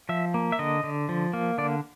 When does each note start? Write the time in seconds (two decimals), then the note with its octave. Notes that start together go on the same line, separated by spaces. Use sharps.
0.09 F3 E5
0.34 A#3
0.52 E5
0.59 D3 D#5
0.84 D3
1.09 F3
1.33 A#3
1.58 D3 D5